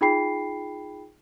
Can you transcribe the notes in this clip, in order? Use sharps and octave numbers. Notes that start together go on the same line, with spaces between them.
D#4 F4 G#4 G5 B5 C7